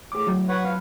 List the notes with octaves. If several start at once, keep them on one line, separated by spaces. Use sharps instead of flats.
A2 G#4 D6
F#3
B4 C#5 F#5
F3 F5